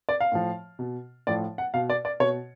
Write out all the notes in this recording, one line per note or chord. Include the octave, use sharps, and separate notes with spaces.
D5
F5
A2 F3
B2
A2 F3 D5
F#5
B2 F5
D5
D5
B2 C#5